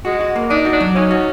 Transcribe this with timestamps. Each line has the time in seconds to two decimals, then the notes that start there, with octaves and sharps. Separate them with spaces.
0.05 G#3 F#4
0.21 F#4
0.36 A#3
0.50 D4 D#4
0.65 F#4
0.73 D4
0.80 F#3
0.95 C#4 D#4
1.11 F#4